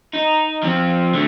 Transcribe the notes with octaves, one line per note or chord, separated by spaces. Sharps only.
D#4
F3 C4
D3 A3